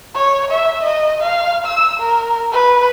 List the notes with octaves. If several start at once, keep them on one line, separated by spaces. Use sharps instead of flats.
C#5
E5
D#5
F5
E6
A#4
B4